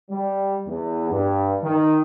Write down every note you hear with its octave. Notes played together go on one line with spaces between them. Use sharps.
G3
E2
G2
D#3